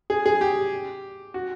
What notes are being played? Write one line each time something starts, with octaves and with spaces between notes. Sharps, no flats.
G#4
G#4
G4
F#4